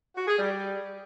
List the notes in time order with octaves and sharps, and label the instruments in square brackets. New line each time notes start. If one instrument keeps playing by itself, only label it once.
[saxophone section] F#4
G#4
G3